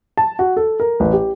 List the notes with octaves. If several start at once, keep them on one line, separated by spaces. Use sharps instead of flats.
A5
F#4
A4
A#4
A1
G4